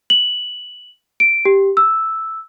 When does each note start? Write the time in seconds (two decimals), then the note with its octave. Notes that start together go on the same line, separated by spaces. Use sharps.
0.10 F#7
1.20 D7
1.45 G4
1.77 E6